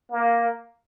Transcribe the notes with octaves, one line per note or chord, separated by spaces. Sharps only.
A#3